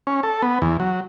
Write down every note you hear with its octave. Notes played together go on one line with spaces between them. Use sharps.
C#4
A4
B3
E2
F#3